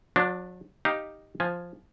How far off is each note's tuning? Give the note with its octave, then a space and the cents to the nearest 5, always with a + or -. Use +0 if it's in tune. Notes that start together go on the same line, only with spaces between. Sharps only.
F#3 -40 D4 +0
D#4 +0 G4 +0 F5 +0
F3 +0 G#5 +0